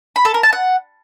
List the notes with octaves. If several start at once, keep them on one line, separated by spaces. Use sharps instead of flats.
B5
A4
A#4
A5
F#5